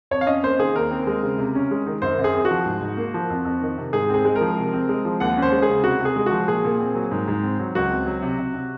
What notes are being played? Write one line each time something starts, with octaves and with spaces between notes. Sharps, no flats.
F2 C#5
F5
C#4 D#5
A#3 C5
D#3 G#4
D#2 A#4
C4
G#3
C#3
C3
C#4
G#3
D#3
F#2 C5
F#2
G#4
C4
F#4
F3
G#2
G#2
A#3
F3
F2
F2
D#3
C3
G#2 G#4
C4 G#4
G#3
A#4
F3
C3
C4
G#3
F3
D#2 F#5
C#4
C5
G#3
G#4
C#3
C3 F#4
C3
G#4
G#3
F#4
F3
A#2 G#4
A#2
C4
F#3
G#2
G#2
C4
F#3
C#2 F#4
C4
F#3
C3
C3
C3